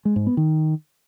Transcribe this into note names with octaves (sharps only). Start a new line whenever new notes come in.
G#3
G#2
B3
D#3